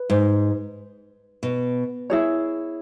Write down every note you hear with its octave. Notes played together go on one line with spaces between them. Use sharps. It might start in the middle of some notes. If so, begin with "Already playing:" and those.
Already playing: B4
G#2
B2
E4 G#4 C#5